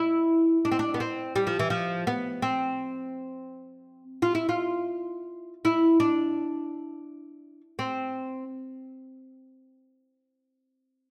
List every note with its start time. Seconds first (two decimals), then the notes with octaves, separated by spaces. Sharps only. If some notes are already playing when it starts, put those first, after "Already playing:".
Already playing: E4
0.65 D4
0.72 C4
0.79 D4
0.94 B3
1.00 C4
1.36 G3
1.47 F3
1.59 E3
1.70 F3
2.07 B3
2.42 C4
4.22 F4
4.35 E4
4.49 F4
5.65 E4
6.00 D4
7.79 C4